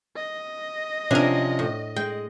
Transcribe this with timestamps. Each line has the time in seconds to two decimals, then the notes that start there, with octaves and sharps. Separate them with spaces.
0.16 D#5
1.11 C3 F3 C#4 D4 A#4
1.59 A2
1.96 G#3 G5